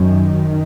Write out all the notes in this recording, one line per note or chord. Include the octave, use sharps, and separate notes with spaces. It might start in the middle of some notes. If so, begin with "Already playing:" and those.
Already playing: F#2 D#3